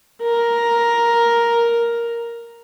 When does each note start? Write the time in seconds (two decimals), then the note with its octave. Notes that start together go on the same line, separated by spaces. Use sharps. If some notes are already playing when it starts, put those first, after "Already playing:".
0.23 A#4